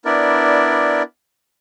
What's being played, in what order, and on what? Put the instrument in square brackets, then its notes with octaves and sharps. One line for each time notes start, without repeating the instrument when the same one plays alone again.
[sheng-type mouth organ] B3 D4 E4 A#4 D5